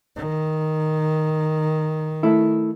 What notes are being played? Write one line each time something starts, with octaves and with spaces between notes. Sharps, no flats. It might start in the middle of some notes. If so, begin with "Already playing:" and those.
D#3
A3 E4